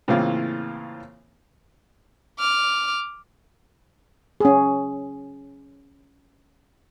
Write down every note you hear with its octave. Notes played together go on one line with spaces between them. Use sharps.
A2 C#3 E3 A#3 C4 F4
D6 F6
C#4 G#4